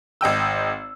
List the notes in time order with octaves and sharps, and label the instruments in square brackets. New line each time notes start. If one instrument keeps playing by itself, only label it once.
[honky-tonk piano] G#1 D#5 G5 E6